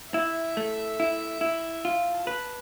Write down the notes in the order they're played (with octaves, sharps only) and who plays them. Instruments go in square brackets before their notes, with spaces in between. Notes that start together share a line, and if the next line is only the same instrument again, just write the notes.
[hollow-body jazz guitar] E4 [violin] E5
[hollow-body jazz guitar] A3
E4
E4
F4
[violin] A5
[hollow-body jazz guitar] B4